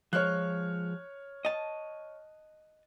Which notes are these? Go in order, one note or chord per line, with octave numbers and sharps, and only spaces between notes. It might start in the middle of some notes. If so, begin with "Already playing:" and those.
F3 G#3 C#5 F6 F#6
D#5 A5